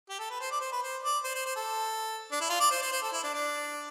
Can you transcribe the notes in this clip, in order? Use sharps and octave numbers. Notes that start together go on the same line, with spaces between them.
G4
A4
B4
C5
D5
C5
B4
C5
D5
C5
C5
C5
A4
D4
E4
F4
D5
C5
C5
C5
A4
E4
D4
D4